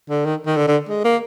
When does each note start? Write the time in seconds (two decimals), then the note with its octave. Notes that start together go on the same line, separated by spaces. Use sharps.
0.10 D3
0.25 D#3
0.46 D#3
0.57 D3
0.68 D3
0.89 G#3
1.04 A#3